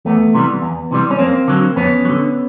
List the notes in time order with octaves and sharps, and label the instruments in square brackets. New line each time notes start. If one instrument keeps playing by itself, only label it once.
[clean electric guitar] E2 A3 B3
C3 E3 G3
E2
C3 E3 G3
C#4
F2 A#3 C4
D3 F#3
F2 B3 C#4
F#3
D3